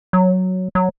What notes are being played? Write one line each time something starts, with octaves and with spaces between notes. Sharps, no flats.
F#3
F#3